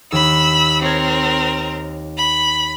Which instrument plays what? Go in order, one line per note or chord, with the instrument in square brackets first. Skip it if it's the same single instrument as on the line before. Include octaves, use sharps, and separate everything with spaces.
[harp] D#2 [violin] B5 E6
[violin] C4 A#4 [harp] C#5 G#6
[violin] B5